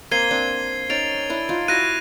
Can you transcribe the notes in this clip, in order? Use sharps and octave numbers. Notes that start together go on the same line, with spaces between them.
A#3 C4 G#6 C7 D#7 G7
C4 D4
C#4 D#4 A6 D7 F7
D4 E4
D#4 F4
E4 F#4 F#6 A#6 D#7